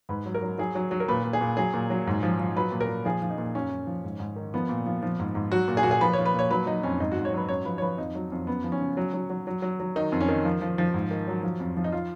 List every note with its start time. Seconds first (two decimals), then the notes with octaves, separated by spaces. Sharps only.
0.09 G#2 B4
0.26 F#3
0.34 A#4
0.42 F#3
0.58 F#3 G#4
0.75 F#3
0.91 F#3
1.00 A#4
1.08 A#2 B4
1.24 A#2
1.33 G#4
1.41 A#2
1.57 F#3 G#4
1.74 A#2
1.90 F#3
2.07 G#2
2.23 F3
2.40 F3
2.56 F#3 B4
2.72 A#2
2.80 A#4
2.88 A#2
3.05 F3 G#4
3.22 F3
3.30 D#4
3.38 A#2
3.55 F#2 C#4
3.72 F#2
3.87 F3
4.04 G#2
4.20 G#2
4.36 D#3
4.54 F3 B3
4.69 A#2
4.86 F3
5.03 F3
5.19 G#2
5.35 G#2
5.52 F#3 F#4
5.68 A#2
5.77 G#4
5.83 A#2 F#4
5.91 G#4
6.01 F3 B4
6.13 F3 C#5
6.26 B4
6.34 A#2 C#5
6.51 F#3 B4
6.66 F#3 D#4
6.83 F2 C#4
7.00 G#2 D#4
7.12 F#4
7.17 G#2
7.25 C#5
7.33 F#3 B4
7.49 F#2 C#5
7.65 F3 B4
7.78 C#5
7.82 F3 B4
7.98 F2 D#4
8.15 F#3
8.32 F2
8.47 F#2 B3
8.64 F3
8.72 C#4
8.81 C#3
8.97 F#3
9.13 F#3
9.30 F#3
9.47 F#3
9.62 F#3
9.80 F#3
9.96 D#3 D#4
10.12 F2
10.21 C#4
10.28 D#3
10.45 F3
10.61 F3
10.78 F3
10.94 G#2
11.11 D#3
11.27 F#3
11.43 F3
11.60 F2
11.77 F3
11.84 D#4
11.92 F4